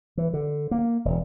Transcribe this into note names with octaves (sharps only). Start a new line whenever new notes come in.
E3
D3
A#3
E1